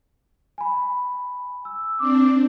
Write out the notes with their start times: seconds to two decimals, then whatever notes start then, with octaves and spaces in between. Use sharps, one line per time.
0.58 G#5 B5
1.65 E6
1.99 C4 D4 D6